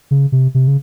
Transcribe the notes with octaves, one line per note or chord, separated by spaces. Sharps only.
C#3
C3
C3
C#3